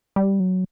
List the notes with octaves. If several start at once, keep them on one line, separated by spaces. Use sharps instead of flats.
G3
F#3